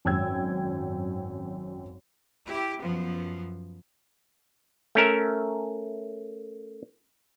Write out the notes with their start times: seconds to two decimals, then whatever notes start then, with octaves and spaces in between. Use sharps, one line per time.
0.05 G#1 F#2 G5 E6 G#6
2.47 E4 G4
2.80 F#2 F3 B3
4.95 A3 C#4 A#4 E5